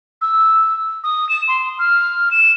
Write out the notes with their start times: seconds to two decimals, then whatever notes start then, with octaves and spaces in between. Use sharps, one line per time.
0.21 E6
1.04 D#6
1.29 E7
1.48 C6
1.79 F6
2.31 E7